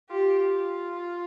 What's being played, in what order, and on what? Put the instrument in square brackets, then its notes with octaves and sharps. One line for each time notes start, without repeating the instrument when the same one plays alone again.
[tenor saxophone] F4 [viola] G4